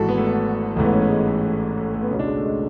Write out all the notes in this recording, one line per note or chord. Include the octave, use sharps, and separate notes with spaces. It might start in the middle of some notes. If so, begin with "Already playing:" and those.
Already playing: G#1 G#2 E3 E4 F#4 A4
B3
A3
B3
A1 G#2 E3 A3
B3
C#4
B3
G#3
A3
A3
A3
A3
B3
C#2 B2 C#4
D4
G#3
A3
G#3